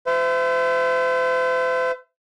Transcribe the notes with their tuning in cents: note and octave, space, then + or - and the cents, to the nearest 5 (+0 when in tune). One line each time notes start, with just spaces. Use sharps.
C5 -40 E5 +20